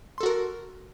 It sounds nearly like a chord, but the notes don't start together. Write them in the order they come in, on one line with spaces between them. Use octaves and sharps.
C6 A4 F#4 A#4